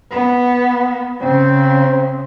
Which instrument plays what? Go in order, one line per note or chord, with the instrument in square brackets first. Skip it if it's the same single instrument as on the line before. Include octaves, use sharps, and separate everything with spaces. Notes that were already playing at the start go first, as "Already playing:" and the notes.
[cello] B3
[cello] C#3 [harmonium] C4